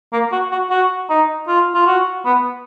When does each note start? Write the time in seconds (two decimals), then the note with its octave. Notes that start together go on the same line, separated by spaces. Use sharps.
0.13 A#3
0.32 F#4
0.52 F#4
0.70 F#4
1.10 D#4
1.48 F4
1.75 F4
1.87 F#4
2.25 B3